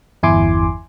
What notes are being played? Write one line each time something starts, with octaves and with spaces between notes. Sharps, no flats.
G1 E2 E4 G#5 C6 D6